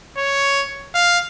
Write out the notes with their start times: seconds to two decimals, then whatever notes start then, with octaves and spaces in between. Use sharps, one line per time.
0.17 C#5
0.94 F5